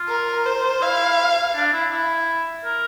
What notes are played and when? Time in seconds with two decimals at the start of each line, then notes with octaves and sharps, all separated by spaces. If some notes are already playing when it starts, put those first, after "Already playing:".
Already playing: F4
0.09 A#4
0.46 C5
0.81 E4 F5
1.56 D4
1.73 E4
1.92 E4
2.65 A#4